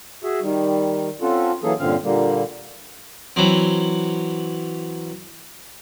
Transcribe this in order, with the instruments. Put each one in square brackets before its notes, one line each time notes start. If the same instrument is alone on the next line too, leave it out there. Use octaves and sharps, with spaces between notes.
[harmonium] F#4 G#4 E5
D#3 G3
C4 C#4 F4 F#4 A4
E3 F#3 A#3 C#4 G#4 A4
G2 A#2 D3 C4 C#4 F5
A#2 D3 G3 A#3
[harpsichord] E3 F#3 C4